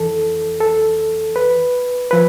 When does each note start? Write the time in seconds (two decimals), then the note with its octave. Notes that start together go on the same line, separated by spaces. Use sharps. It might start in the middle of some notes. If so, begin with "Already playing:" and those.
Already playing: F2 E3 A4
0.60 A4
1.36 B4
2.11 F3 B4